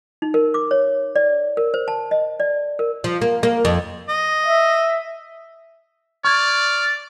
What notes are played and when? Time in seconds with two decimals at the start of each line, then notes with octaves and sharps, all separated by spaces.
0.22 D#4
0.34 A#4
0.54 D6
0.71 C#5
1.16 D5
1.57 A#4
1.74 C5
1.88 A5
2.11 D#5
2.40 D5
2.79 A#4
3.04 F3
3.21 A#3
3.43 A#3
3.65 F2
4.09 D#5
4.46 E5
6.25 D5 C#6 F6 G#6